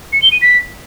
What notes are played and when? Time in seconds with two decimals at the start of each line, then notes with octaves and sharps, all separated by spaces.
0.13 C#7
0.22 G7
0.32 D#7
0.42 B6